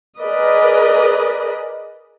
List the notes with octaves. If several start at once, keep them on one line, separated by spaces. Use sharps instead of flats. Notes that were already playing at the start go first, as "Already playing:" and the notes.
G#4 A#4 B4 D5 D#5